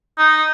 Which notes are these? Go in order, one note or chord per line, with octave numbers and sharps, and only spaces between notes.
D#4